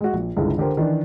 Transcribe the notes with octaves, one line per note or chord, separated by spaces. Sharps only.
G#3 F#4
A#1
G1 C#2 D3 G#3 E4
D3 G4 A#4 C5
D#3 E3 D4